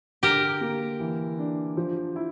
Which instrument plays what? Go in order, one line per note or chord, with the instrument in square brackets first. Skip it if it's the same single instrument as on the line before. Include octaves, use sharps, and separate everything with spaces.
[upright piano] D3 [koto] G4 A#4
[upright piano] A#3
E3
D4
F3
E4